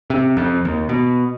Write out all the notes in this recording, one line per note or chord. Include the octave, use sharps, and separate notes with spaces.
C3
F2
D#2
B2